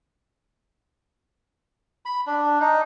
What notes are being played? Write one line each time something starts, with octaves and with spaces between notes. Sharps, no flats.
B5
D4
D#4